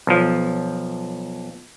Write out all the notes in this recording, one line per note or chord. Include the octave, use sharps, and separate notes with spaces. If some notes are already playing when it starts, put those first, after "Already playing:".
B1 F3